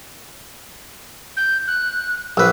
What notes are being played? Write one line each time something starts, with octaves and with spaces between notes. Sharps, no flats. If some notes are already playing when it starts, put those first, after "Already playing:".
G6
F#6
A#1 B4 E6